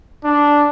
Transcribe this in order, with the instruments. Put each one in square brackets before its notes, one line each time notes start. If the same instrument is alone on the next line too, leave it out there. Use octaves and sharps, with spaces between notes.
[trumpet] D4